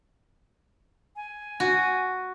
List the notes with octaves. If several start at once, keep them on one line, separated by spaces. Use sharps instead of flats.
G#5
F#4